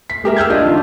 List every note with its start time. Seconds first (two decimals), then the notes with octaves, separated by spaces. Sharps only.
0.10 B6
0.24 G#3 G4 A#4 E5
0.37 E6 F6 G6 G#6
0.50 D4 F4 D5 D#5
0.65 D#3 D4 F4